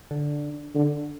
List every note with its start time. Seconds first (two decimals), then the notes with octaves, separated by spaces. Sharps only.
0.11 D3
0.75 D3